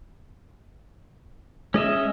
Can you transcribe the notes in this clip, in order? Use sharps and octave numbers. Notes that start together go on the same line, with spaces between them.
G#3 C#4 D#5 E5